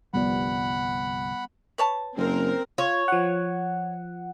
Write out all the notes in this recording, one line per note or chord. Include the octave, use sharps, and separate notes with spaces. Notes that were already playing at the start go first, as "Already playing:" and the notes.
G1 C2 F3 G3 B3 D5 F#5 B5
B4 C#5 A5
F#1 C4 A#4
F4 C#5
F3 F#5